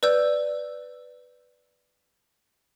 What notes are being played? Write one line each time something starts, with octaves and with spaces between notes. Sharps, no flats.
B4 D5 E6 G6